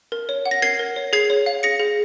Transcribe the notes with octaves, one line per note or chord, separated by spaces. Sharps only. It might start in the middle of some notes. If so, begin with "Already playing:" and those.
A#4
C#5
F#5
A#6
A#4 G#6 C7
A#4
C#5
G#4 G#6 C7
C#5
F5
G#4 A#6 C#7
G#4